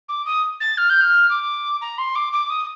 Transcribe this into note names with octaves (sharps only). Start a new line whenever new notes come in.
D6
D#6
A6
F6
G6
F6
D6
A#5
C6
D6
D6
D#6